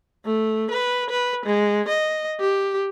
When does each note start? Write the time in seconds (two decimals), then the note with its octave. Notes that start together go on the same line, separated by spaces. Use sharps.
0.25 A3
0.71 B4
1.10 B4
1.46 G#3
1.88 D#5
2.40 G4